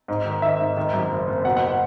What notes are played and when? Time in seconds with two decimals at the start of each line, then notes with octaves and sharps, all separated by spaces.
0.08 G#2
0.26 D#3
0.42 D#3 E5
0.60 G#2
0.77 D#3
0.93 F#2
1.11 F#1
1.28 F#1
1.45 B2 F#5
1.57 F#5
1.68 F#5